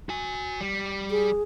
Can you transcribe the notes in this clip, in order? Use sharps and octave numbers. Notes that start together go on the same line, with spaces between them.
F#4 G#5
G3
G#4